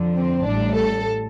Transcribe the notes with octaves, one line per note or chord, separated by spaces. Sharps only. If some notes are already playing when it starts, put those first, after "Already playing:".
Already playing: F2 D3 F3
C4
A1 A2 G3 D4
A4